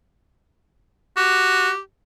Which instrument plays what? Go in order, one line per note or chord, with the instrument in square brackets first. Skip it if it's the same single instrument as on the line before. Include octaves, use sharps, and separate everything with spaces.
[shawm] F#4 [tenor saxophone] G4